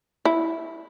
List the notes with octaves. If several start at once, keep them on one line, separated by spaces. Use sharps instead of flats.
E4